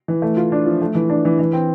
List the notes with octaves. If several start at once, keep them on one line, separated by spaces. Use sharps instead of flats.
E3
A3
F4
D4
F3
A3
E3
D4
E3
E3
C4